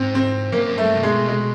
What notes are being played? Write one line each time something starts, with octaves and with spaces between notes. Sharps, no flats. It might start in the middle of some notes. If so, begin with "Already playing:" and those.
Already playing: G#2 C4
C4
F#2 A#3
G2 A3
C3
B2 G#3
G#3